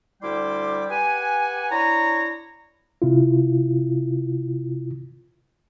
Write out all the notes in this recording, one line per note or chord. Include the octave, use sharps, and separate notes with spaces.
D2 G3 E4 G5 C6 D6
G4 B4 F#5 G#5
D4 E4 C#5 A#5
C3 E4 F4